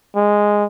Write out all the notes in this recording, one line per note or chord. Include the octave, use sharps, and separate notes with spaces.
G#3